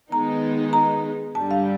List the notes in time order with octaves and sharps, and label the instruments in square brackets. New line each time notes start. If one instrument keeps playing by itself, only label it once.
[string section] D#3 G#3 B3 D#4 [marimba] A#5
[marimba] A#5
[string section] G2 D3 G3 [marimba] A5
[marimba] F5